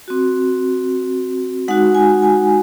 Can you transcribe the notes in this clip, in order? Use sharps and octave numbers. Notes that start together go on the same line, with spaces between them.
C4 F#4
G#3 D#4 F#4 F#5
G#5
G#5